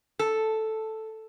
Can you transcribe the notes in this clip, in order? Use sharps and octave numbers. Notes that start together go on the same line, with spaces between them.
A4